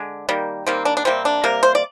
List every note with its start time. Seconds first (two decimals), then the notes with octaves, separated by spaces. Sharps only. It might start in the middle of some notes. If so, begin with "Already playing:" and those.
Already playing: D3 G#3
0.29 D#3 G3 A#3
0.67 D#3 G3 A#3 C4
0.85 D4
0.97 D4
1.05 C3 G3 A#3 C4
1.25 D4
1.44 C3 G3 A#3 A#4
1.63 C5
1.75 D5